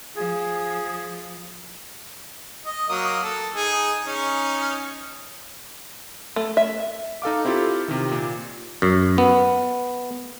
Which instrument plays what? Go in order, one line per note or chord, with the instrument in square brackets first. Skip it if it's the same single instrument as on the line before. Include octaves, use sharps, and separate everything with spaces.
[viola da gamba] F3 [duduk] G#4
[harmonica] D#5
F#3 A#3 D#6
A4
D#4 G#4
C#4 D#4
[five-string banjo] A3
E5
[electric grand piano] D#4 A4 F5 D6
C4 E4 F4 G4 A4
C3 D#3
A#2
[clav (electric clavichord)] F#2
B3